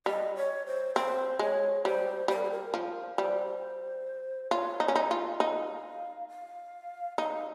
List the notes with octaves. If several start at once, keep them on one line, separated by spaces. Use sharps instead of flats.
G3 D#5
C#5
C5
C4 C5
G#3 C#5
G3 C5
G3 C5
A#4
G#4
A#4
F3
G3 C5
F4 C#5
D#4
C#4
D#4 F5
F4
D#4 F5
F5
D#4 F5